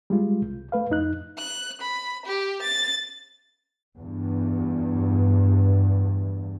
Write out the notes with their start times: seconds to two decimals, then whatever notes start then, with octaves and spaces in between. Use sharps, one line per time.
0.10 G3 G#3 F4
0.42 C2
0.72 A3 B4 F5
0.90 F2 D#4 F#6
1.38 F#6
1.81 B5
2.25 G4
2.62 A6
3.97 E2 G2